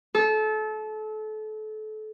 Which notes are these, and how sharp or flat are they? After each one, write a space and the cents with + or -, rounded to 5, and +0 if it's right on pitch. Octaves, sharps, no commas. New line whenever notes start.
A4 -30